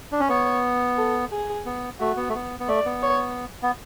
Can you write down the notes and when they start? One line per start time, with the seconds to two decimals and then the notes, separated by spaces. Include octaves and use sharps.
0.12 D4
0.20 C#4
0.29 B3 C#5
0.97 A4
1.32 G#4
1.66 B3
2.00 A3 F#4
2.17 B3
2.29 A3
2.35 B3
2.60 B3
2.68 A3 D5
2.86 B3
3.03 C#5
3.62 B3